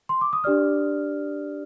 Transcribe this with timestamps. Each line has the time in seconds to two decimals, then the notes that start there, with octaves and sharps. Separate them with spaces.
0.09 C6
0.21 D6
0.33 D#6
0.44 D4 G4 D5 F6